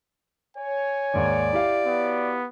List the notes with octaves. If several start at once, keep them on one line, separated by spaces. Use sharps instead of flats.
C#5 G#5
D#2 G#2 D#3 D5
E4 G4 F5
F#3 B3